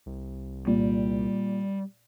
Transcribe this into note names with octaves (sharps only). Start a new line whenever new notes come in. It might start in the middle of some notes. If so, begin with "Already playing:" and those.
C2
A#2 G3